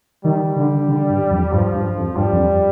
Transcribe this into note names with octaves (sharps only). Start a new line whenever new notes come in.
D#3 G3
D3
D3
G2
F2
G2 F3
G2
F2
G2 G3
F2